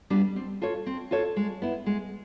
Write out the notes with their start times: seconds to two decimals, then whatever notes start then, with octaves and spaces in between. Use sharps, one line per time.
0.10 G3 B3 D4
0.36 C4
0.62 F4 A4 C#5
0.86 C4
1.11 F4 A4 C#5
1.37 G#3
1.62 B3 E4
1.86 G#3